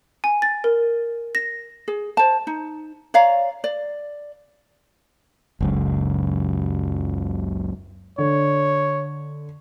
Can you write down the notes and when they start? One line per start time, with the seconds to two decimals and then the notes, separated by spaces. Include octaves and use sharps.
0.24 G#5
0.42 A6
0.64 A#4
1.35 A#6
1.88 G#4
2.17 C5 A5
2.47 D#4
3.14 C#5 D5 F5 A#5
3.64 D5
5.61 F#1 C#2 F#2
8.18 D3 C#5